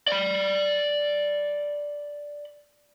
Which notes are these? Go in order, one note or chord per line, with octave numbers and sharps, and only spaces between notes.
D5 B5